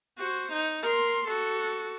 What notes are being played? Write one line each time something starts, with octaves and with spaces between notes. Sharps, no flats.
F#4 C5
D#4
A#4 C6
F#4 A4